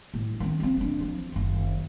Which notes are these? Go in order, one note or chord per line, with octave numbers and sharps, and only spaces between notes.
A2
D#3 C#4
F3 C4
A3 D4
E3 F3
F#1 D#3